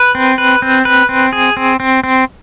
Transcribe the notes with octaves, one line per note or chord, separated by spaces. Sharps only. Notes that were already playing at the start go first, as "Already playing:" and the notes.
Already playing: B4
C4
B4
C4
B4
C4
G#4
C4
C4
C4